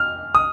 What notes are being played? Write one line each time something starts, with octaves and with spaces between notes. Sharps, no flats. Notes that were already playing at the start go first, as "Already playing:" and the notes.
Already playing: F6
D#6